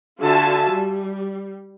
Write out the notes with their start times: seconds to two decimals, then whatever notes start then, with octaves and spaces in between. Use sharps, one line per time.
0.20 D3 F4 F#4 E5 G#5 A5
0.70 G3